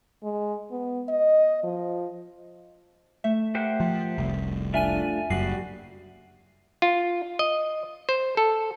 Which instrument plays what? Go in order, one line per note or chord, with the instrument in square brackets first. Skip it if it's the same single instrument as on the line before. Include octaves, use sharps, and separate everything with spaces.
[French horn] G#3
B3
D#5
F3
[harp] A3 [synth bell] E5
[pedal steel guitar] G4 C5 F#5 [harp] A#4
[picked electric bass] F3
F1 C2
[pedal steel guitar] A3 D4 F4 [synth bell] E5 G#5 D#7
[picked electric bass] F#1 F#2 [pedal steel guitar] G3 F#4 [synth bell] C7
[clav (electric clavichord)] F4
D#5
C5
A4